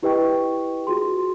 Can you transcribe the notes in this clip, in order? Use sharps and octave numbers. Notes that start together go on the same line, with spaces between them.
E4 G4 B4 D#5 G5 C#6
F4 F#4 G#4 C6